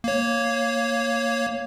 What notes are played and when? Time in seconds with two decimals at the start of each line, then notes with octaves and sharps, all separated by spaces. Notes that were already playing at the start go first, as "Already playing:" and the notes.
0.04 A#3 C#5